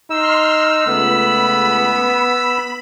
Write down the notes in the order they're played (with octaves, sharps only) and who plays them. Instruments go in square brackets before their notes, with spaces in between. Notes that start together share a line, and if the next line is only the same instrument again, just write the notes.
[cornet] D#4 [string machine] C6 F6 [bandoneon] E6
[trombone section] C#2 A3 [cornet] B3 [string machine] B5